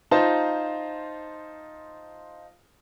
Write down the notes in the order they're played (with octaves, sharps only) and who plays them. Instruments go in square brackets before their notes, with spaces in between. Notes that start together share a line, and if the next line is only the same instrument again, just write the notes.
[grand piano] D#4 F4 C5 A5